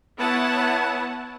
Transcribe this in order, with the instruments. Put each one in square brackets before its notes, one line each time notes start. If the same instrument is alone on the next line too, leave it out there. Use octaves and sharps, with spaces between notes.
[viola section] B3 E4 B4 C#5 F#5 A5